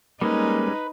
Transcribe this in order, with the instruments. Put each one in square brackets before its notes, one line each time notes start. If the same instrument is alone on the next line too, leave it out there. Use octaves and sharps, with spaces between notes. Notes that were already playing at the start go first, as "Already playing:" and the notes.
[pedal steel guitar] G3 G#3 C#4 [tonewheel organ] A#3 [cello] D#4 [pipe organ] B4